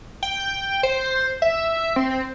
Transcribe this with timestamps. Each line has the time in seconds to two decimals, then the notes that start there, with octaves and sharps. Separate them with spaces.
0.23 G5
0.83 C5
1.42 E5
1.96 C4